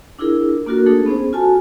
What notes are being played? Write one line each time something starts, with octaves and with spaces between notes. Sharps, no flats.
D4 E4 F4 G#4 A#4
A#3 D4 F4 F#4 A4 A#4
A3 D4 D#4 G#4 A4
B3 C#4 G#4 C5
F4 F#4 A4 G#5 A5